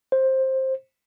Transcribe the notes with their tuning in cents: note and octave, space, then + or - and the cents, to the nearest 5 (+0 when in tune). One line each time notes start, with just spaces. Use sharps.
C5 +15